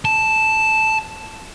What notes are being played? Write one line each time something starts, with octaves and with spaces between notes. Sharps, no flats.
A5